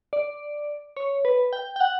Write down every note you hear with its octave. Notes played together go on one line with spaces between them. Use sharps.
D5
C#5
B4
G5
G5
F#5